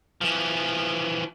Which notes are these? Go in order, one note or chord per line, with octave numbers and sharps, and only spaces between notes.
E3 F3